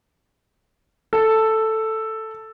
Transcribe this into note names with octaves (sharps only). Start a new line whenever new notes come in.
A4